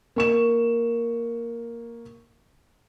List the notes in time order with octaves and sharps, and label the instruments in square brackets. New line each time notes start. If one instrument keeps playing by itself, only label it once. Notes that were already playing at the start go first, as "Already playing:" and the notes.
[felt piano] A#3 C#6 E7